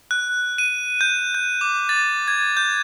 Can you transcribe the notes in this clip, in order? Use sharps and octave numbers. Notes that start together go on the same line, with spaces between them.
F#6
D#7
G6
G6
D6
A6
G#6
G6